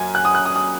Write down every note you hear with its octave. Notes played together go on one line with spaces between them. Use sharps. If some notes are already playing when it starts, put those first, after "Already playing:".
Already playing: F#2 F#3 G#5
F#6
D#6
F#6
D#6
D#6